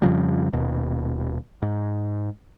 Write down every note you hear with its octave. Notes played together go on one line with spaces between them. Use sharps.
F2 C#3 F3 G3
D#1 D#2 B2
G#2